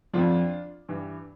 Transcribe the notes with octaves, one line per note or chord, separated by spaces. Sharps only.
F2 D3 F3 D4 F4
G2 E3